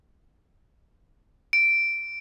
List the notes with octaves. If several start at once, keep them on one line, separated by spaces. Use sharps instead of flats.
D7